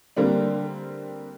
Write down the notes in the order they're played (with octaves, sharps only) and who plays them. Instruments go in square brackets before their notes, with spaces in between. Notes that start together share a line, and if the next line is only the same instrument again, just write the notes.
[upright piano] D3 G3 A#3 C4 D4